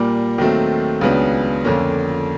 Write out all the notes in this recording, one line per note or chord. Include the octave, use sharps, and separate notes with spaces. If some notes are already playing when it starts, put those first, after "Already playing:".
Already playing: A#2 G3 A#3
D#2 D#3 F#3 A3 C4
C#2 C#3 F#3 B3 D4
F2 D3 F3 A#3 C#4